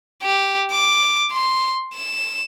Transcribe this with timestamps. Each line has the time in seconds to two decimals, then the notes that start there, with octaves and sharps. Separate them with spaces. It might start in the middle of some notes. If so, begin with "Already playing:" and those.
0.23 G4
0.71 D6
1.32 C6
1.95 E7